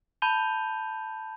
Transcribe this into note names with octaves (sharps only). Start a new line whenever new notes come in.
A5 B5 G6 D#7 F7 G7